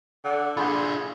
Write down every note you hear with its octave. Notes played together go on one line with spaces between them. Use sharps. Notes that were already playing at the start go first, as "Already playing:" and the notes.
D3 F#5
D4 F4 G#4 B5 C6 G6